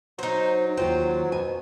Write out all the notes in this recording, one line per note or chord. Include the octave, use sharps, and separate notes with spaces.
F#3 D#4 C5
D#2 F4 C5 G5
B2 G#5